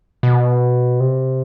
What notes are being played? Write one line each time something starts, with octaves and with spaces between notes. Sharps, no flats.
B2
C3